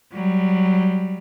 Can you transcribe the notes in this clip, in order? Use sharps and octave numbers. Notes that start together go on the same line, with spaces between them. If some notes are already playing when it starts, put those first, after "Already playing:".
F#3 G3